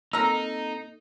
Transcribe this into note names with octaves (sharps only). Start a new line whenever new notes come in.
A#3 C4 D#4 A4 A#4 A#5 E6